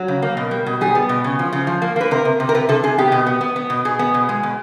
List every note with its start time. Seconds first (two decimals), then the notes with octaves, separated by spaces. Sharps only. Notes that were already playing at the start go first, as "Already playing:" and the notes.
Already playing: F#3
0.08 C#3
0.22 A#3
0.37 B2
0.51 G3
0.66 B2
0.81 G3 G#4
0.95 B3
1.09 B2
1.24 C#3
1.39 F3
1.53 C#3
1.67 F3
1.82 A#3
1.96 A#3 B4
2.11 C3 A#4
2.25 C3
2.40 C3
2.49 A#4
2.55 C3 B4
2.69 C3 A4
2.84 C3 G#4
2.98 B3 G4
3.12 B2
3.26 B3
3.41 B3
3.56 B3
3.70 B2
3.85 B2 G#4
3.99 B3
4.14 B2
4.29 G#3
4.43 B2